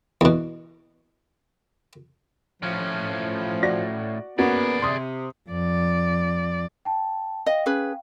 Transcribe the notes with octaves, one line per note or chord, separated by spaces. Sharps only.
E2 B2
A2 F3 C#4
F#4 D5 A#6
A#3 B3 C#4 F#4 G#4 D5
C3 C6 D#6
F2 D5
G5 A5
D#5 F5 G5
C#4 G#4 B4